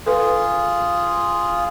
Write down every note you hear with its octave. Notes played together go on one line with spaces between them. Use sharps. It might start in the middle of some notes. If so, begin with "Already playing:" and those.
F4 G#4 A4 B4